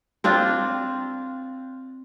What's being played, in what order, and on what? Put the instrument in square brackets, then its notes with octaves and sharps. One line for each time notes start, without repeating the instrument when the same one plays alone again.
[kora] C4 D4 F4